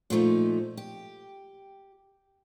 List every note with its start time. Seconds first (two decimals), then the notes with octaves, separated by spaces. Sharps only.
0.10 A#2 F3 A3 D#4
0.77 G4